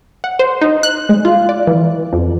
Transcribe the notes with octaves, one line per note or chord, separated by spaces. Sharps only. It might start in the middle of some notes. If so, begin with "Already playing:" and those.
F#5
C5
D#4
F#6
G#3
F4
D5
E3
F2